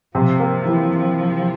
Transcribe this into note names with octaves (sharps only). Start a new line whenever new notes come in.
C3 F3
A#3
E3